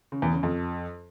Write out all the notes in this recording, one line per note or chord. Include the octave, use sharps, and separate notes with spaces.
C#3
E2
C#3
F2